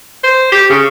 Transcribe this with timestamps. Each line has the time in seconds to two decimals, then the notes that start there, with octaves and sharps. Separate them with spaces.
0.24 C5
0.52 G4
0.70 C#3